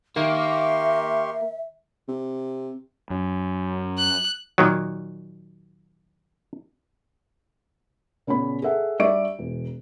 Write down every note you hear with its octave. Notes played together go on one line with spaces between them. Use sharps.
D#3 A#3 G4 E5 C6 C#6
C3
F#2
F#6
A#2 D#3 F#3
A#2 C#3 B3 C#4 B5
G#4 A4 E5 F#5
G3 D4 D5 E5 C#6 D7
E1